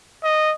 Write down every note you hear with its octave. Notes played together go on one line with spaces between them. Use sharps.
D#5